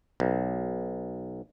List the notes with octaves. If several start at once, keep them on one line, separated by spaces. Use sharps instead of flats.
B1